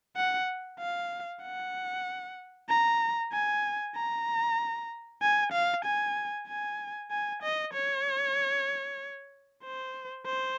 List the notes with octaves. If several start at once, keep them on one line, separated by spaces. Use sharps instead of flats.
F#5
F5
F#5
A#5
G#5
A#5
G#5
F5
G#5
G#5
G#5
D#5
C#5
C5
C5